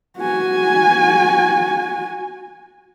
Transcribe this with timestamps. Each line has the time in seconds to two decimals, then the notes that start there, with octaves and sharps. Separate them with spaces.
0.18 F#4 G#5